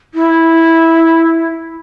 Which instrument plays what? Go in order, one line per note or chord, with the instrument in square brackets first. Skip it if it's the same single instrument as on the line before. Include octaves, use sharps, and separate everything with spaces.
[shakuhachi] E4